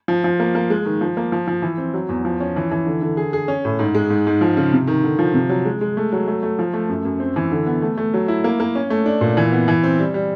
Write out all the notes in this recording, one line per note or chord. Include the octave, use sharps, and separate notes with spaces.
F3
F3
A#3
A#3
G#3
D#3
F3
A#3
F3
F3
E3
C4
F#3
E2
F3
C#4
E3
E3
D3
D3
G#4
G#4
C#4
A2
G#2
G#3
G#2
G#2
F3
C#3
C3
D#3
D3
F3
C3
F#3
G#3
G#3
A3
F#3
A3
A3
F3
A3
F#2
F#2
C4
E3
D3
B3
A3
A3
F#3
E4
A#3
A#3
C#4
A3
D4
A#2
E3
B3
E3
C4
G3
G3